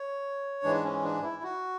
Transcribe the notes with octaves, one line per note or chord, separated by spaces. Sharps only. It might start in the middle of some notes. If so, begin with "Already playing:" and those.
Already playing: C#5
G#2 E3 G#3 D4
C#4
D4
E4
F#4